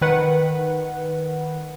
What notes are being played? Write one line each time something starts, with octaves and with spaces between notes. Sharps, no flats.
D#3 B4 F#5